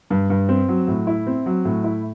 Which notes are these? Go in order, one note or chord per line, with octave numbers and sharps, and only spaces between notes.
G2
G2
C4
F#3
A2
E4
C4
F#3
A2
E4